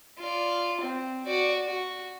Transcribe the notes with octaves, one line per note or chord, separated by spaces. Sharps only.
F4 D5
C4
F#4 D5
F#4